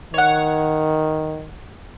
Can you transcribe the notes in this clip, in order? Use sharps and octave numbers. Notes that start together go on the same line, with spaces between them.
D#3 C#5 F#5